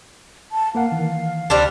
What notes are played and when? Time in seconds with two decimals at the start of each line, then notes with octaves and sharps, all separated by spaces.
0.52 A5
0.75 A#3 A#4 F5 F#5
0.92 D#3 E3
1.50 D2 G3 C4 D4